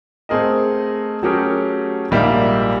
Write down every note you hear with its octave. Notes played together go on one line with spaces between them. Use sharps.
A3 C4 G#4 A#4 D#5
F#3 A3 C#4 G4 G#4 A#4
A#1 G#2 G3 A#3 D#4 E5